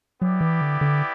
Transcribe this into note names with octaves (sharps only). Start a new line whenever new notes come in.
F#3 B3 E4 G4 D5
E3
D3
D3